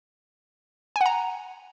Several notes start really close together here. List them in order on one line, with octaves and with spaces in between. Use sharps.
G#5 F#5 A#5